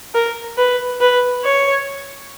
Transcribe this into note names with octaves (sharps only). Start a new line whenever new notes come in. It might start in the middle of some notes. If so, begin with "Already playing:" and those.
A#4
B4
B4
C#5